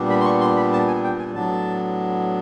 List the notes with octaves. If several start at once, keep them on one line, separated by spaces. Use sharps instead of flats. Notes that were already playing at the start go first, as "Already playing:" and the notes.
Already playing: A#2 G3 B3 D4
B5
C6
C#6
C6
B5
A5
G#5
G5
G#5
A2 F#3 B3 D4 A5